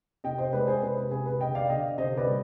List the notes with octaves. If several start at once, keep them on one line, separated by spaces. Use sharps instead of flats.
C3 D#5 G5
C5 D#5
G#3 B4 D5
G#4 C5
C3 B4
B4
C3 G#4
B4
D3 D#5 G5
D5 F5
D3 D#5 G5
C3 C5 D#5
B4 D5
G3